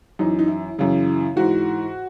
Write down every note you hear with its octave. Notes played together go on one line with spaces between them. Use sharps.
F#2 E3 D#4
D#4
E4
F#2 C#3 E3
G#2 E3 F#4